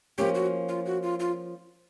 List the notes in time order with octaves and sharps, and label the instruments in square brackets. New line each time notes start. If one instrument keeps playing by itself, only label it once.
[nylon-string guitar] F3 A#3 C#4 [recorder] G4
[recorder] F#4
F4
F#4
F4
F4